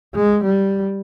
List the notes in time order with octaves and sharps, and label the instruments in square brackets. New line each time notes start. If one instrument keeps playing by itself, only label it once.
[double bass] G#3
G3